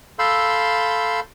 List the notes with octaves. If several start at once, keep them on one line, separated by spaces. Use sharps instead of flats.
A4 F5 B5 C6 E6 G6